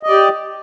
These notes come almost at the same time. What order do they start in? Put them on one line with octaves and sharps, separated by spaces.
D#5 D5 G4